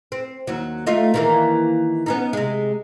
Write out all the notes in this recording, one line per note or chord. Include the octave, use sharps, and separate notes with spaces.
C4
D#2 F#3
A3 D#4 F4
D#3 E3 A#3
B3 C#4 D#4
C3 G#3